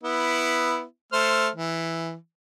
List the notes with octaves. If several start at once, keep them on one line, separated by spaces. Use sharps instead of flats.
B3 E4
A3 C5 F6
E3